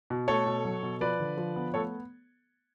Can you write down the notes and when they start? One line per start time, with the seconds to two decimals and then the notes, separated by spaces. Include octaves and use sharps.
0.10 B2
0.28 A3 A4 C#5
0.46 B2
0.65 F#3
0.83 B2
1.01 F3 B4 D5
1.20 D3
1.37 F3
1.56 B3
1.74 A3 A4 C#5